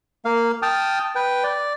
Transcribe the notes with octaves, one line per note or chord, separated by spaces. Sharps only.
A#3 F5
G5 A5 D#6 F6
B4 G5
D5